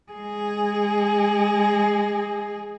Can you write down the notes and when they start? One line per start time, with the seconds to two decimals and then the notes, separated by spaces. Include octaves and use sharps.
0.12 G#3 G#4